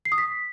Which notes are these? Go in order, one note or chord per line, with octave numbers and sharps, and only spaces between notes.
C7
D#6
B6